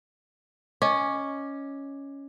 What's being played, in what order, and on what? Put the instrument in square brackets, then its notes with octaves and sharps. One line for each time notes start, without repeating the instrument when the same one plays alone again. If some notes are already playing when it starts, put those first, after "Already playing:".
[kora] C#4 [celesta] D#5 D6